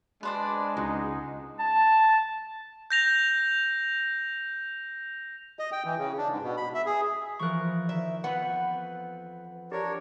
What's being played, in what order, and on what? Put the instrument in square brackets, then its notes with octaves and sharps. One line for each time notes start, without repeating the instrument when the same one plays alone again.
[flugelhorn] G#3 [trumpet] D4 [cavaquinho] B4 C5 D5
[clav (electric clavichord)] C#2 [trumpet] D#4 [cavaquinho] F#4
[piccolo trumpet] A5
[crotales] G6 A#6 F7
[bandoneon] D#5
G5
E3
C#3
D4
G#2
B2
B5
E5
G#4
[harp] E3 F3 A#4 [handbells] C#6 F#6
[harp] D#3 [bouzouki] E5
[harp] F2 B4 [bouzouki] B3 [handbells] F#5 B5
[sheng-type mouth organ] D4 A#4 C#5 [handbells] G4